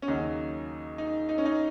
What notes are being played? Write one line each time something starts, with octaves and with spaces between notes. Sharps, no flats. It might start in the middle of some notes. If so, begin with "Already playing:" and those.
C#4
D#2 C#3 F#3 D#4
D#4
D#4
C#4
D#4